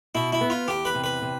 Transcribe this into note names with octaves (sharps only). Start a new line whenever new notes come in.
B2 E4
E4
B3
F4
E2 G4
B4
C3
B4
C3